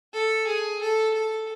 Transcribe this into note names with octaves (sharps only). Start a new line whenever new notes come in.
A4
G#4
A4
A4